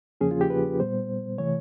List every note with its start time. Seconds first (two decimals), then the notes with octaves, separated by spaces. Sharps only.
0.21 E2 C#3 F3 A#3 C#4 G#4
0.31 F4
0.41 G4
0.50 B4
0.79 A#2 G3 B3 C5
1.38 C3 E3 A3 C#5